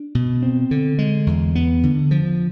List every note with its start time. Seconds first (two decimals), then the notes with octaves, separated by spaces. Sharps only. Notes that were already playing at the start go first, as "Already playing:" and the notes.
Already playing: D4
0.15 B2
0.43 C4
0.71 D3
0.98 G#3
1.27 E2
1.55 B3
1.83 D3
2.11 F3